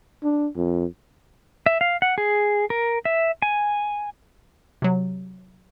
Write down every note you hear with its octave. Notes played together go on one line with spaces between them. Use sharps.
D4
F2
E5
F5
F#5
G#4
A#4
E5
G#5
C3 F#3